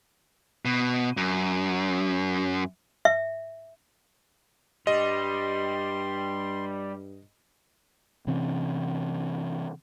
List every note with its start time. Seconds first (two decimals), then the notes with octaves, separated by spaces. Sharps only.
0.65 B2
1.17 F#2
3.05 E5
4.87 G2 G3 D#5 C6
8.27 C3 E3 C4 C#4